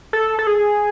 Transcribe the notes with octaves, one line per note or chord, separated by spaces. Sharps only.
A4
A4
G#4